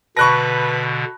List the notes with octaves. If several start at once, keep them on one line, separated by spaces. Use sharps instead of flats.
B2 D3 B4 A5 B5 C#6 F#6 A#6